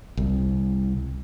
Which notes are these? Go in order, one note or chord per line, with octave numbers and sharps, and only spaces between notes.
C2